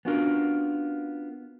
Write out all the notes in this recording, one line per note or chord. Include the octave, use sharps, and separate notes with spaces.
B3 C#4 D4 F4 F#4 A#4